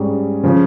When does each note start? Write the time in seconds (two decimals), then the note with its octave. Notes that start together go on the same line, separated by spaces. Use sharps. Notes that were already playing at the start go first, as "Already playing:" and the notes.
Already playing: G#2 G3 C#4 G#4
0.44 C#3 F3